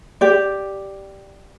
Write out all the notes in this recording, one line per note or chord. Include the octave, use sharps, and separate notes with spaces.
G4 D5